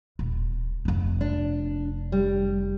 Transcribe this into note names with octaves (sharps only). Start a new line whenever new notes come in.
D#1
F1 C3
D4
G3